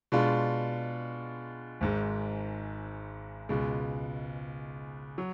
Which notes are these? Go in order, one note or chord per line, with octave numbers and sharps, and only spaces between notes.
B2 G#3 D4 F4
G#1 G#2 G#3
C#2 B2 G#3
F#3